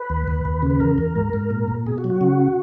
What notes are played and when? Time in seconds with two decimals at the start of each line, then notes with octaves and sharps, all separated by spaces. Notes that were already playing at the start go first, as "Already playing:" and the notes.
Already playing: B4
0.10 D#2
0.28 D#2
0.45 D#2
0.62 C#3
0.70 B4
0.80 E2 A#4
0.98 E2
1.16 G#2
1.33 G#2
1.50 A#2
1.68 A#2
1.86 B2 G#4
1.98 F#4
2.04 F#3
2.10 F#4
2.21 C#3